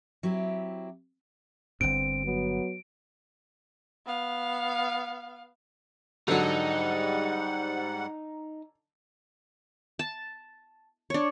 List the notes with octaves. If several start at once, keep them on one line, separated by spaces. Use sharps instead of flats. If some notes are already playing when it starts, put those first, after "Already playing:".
F#3 C4 E4 G4
G1 G2 C4 D7
F#3 B3
B3 F5
G#2 D3 F#3 G3 D#4 F#5
A5
D4 C#5